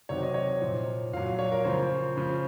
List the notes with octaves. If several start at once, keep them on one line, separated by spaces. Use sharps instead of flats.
C3 D#3 F#3 C#5
D#5
C#5
A#2 F3
A#2 F#3 F5
F5
C#5
A#4
C#3 F3 C5
C#3 F3